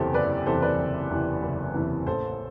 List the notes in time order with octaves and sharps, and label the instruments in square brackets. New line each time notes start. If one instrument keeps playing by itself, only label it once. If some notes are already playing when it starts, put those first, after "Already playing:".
Already playing: [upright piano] F#1 E2 C3 E3 G4 A4 C5
F#1 B4 D5
E2 C3 E3 A4 C5
B4 D5
F#1
E2 C3 E3
F#1
E2 C3 E3
A1 A4 C5